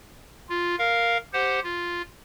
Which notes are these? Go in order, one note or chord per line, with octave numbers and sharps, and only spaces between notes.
F4
A#4 F5
G4 C5 F#5
F4